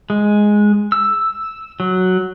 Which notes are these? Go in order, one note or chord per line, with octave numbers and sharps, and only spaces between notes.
G#3
E6
F#3